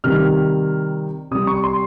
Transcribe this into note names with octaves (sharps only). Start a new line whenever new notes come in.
C3 D#3 G3 F6
C3 G3 D#6
C#6
C6